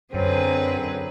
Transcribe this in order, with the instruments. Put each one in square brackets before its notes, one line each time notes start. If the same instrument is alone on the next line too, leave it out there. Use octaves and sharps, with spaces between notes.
[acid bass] F#2 [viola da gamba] D3 G#4 B4 [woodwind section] F#3 [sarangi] C4